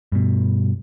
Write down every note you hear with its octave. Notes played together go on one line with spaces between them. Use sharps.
G2 B2